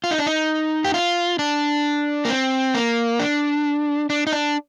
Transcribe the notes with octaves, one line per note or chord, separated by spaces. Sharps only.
F4
D#4
D4
D#4
G4
F4
D4
A#3
C4
A#3
D4
D4
D#4
D4